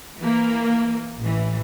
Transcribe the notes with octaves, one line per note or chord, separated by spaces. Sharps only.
E3 A#3
A1 E3